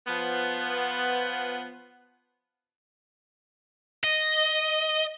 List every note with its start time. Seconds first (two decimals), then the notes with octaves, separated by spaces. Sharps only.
0.07 F3 B3
4.04 D#5